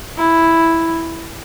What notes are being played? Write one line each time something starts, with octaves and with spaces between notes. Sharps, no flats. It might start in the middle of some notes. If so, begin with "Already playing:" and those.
E4